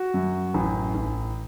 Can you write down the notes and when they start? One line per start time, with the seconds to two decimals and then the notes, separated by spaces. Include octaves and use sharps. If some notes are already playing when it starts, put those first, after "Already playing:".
Already playing: F#4
0.14 F#2
0.54 A1
0.95 A1